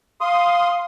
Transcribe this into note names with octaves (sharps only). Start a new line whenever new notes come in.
F5 C6 D#6